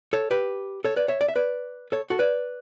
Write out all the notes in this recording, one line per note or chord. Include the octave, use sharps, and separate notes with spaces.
A4 C#5
G4 B4
A4 C#5
B4 D5
C#5 E5
D5
E5
B4 D5
A4 C#5
F#4 A4
B4 D5